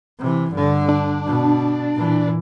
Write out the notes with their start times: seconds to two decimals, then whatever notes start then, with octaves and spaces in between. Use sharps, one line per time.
0.19 C3 E3
0.51 G2 D3
0.89 D4
1.25 B2
1.94 A#2 E3